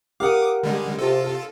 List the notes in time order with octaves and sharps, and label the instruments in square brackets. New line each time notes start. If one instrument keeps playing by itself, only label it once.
[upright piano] G4 A#4 [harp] F5 F#5 [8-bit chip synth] D6 D#6
[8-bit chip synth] D3 G3 G#3
[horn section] C3 [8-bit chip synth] F4 A4 [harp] D#5